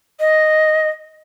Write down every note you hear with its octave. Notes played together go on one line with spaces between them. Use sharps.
D#5